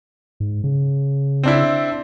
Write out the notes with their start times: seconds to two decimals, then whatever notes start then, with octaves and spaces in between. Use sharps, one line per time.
0.40 G#2
0.64 C#3
1.44 C4 D4 E4